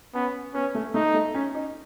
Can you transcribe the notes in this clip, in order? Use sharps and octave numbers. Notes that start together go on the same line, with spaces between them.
B3 C#4
B3 C#4
A3
A3 D#4
A3
C#4
D#4